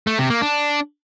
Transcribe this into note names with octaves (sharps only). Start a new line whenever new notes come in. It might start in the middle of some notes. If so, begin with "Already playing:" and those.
A3
C3
A#3
D4